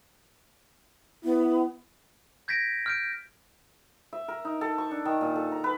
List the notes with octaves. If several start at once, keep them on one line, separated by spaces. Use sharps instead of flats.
B3 E4
G6 G#6 A#6 B6 D7
F6 G6 D7
E5
A#4
D#4
A4
C#6
D4
D#3
A#2
A4
A#5
B4